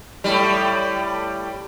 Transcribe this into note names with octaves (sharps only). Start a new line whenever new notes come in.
A2 G3